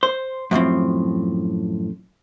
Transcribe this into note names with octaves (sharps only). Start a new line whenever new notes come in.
C5
F#2 A2 F3 C4